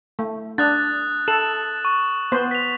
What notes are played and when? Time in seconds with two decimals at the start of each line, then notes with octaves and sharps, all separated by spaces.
0.19 A3
0.58 D4 D#6 F#6 A6
1.28 A4 E7 F#7
1.85 C#6
2.32 B3 C5
2.51 B6 F7